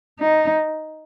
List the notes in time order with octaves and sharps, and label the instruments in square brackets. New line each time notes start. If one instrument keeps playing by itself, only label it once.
[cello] D#4